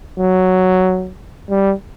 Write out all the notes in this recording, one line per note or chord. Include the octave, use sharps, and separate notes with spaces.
F#3
G3